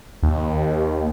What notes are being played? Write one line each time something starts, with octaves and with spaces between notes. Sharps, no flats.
D#2